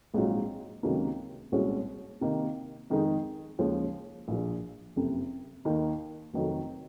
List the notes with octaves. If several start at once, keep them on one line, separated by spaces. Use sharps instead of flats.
A#1 G#2 F#3 C4 F4
C#2 C3 D#3 F#3 A#3
C2 A#2 G#3 C#4 F#4
C3 D#3 A#3 D#4
F2 D#3 G#3 D#4 G#4
D#2 C#3 F3 G#3 C#4
A#1 A#2 F3
F#1 F2 C3
D#2 D#3 A#3 D#4
F1 F2 D#3 F#3